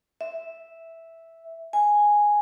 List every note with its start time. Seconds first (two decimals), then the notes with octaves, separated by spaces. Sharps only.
0.21 E5
1.73 G#5